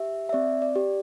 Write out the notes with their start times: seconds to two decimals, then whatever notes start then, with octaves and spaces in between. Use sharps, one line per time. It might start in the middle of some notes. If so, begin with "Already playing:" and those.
Already playing: G4 E5
0.29 E5
0.33 C4 D5
0.62 D5
0.76 G4